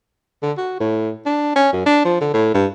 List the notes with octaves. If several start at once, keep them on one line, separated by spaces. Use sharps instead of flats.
D3
F#4
A2
D4
C#4
F#2
D4
F3
D3
A2
G2